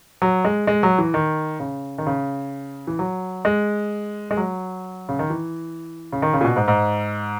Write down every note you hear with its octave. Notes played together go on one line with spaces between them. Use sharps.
F#3
G#3
G#3
F#3
E3
D#3
C#3
D#3
C#3
E3
F#3
G#3
G#3
F#3
C#3
D#3
E3
C#3
D#3
C#3
A#2
B2
G#2
G#2